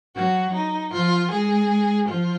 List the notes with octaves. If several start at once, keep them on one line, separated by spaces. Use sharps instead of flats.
F#3 F#4
D#4
F3 F4
G#3 G#4
F3 F4